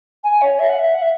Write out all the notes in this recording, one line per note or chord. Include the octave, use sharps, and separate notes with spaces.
G#5
C#5
E5
F#5
E5
F#5
E5